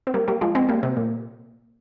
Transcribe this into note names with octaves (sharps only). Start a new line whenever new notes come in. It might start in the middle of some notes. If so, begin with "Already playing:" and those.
C4
G3 A#3
G3 A#3
F3 G#3
G#3 C4
G3 A#3
C3
A#2